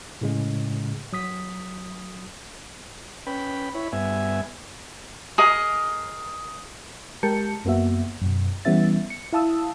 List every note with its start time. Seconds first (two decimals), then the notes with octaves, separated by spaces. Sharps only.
0.21 A2 C#3 G#3
1.13 F#3 D#6 B6
3.27 C#4 B4 G5 B5
3.75 E4 C#5 B5
3.92 G2 B3 E5 G#5
5.38 G#4 A#4 D#5
7.23 G#3 G4 A#4 A5 G6 C#7
7.65 F#2 A#3 B3 F#4 E5
8.21 F#2 B2
8.65 E3 G3 B3 C#4 E5 A6
9.10 C#7
9.33 E4 F5 A5 D#6 E6